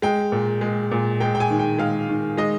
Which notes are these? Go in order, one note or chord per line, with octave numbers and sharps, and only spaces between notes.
G#3 G5
A#2
G#3
A#2
G#3 G5
G5
G#5
D#3
G5
G#3 F5
D#3
G#3 D#5